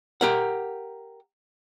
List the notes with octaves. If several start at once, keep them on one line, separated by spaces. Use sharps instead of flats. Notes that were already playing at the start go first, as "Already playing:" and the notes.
G4 A#4 F#5